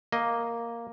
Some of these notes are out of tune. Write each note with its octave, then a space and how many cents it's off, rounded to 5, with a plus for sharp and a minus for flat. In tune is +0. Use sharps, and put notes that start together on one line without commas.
A#3 +0 D#5 +5